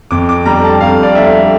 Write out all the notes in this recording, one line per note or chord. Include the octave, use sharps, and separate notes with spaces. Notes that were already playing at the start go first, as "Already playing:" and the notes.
F2 D6
D6
D3 G3 A#5
A5
F2 F5
D5
D3 G3 E5